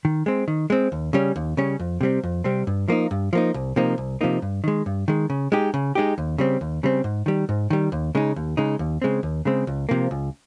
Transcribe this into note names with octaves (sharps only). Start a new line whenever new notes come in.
D#3
G#3 C4
D#3
G#3 C4
D#2
C#3 G3 C#4
D#2
C#3 G3 C#4
F2
C3 G3 C4
F2
C3 G3 C4
G2
F3 A#3 D#4
G2
F3 A#3 D#4
C2
C3 F3 A#3 D#4
C2
C3 F3 A#3 D#4
G2
D#3 G#3
G2
D#3 G#3
C#3
G#3 D#4 G4
C#3
G#3 D#4 G4
D#2
C#3 G3 C4
D#2
C#3 G3 C4
G#2
D#3 G3
G#2
D#3 G3
D#2
C#3 G#3 D#4
D#2
C#3 G#3 D#4
D#2
C#3 G#3 C4
D#2
C#3 G#3 C4
C#2
C3 F3 A#3
C#2